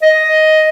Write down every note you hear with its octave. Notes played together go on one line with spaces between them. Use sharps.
D#5